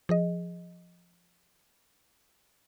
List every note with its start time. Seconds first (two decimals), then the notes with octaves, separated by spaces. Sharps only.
0.09 F3 G#4 D#5